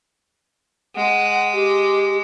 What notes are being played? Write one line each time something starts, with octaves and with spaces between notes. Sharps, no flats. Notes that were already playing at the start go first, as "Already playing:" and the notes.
G#3 F#5
G4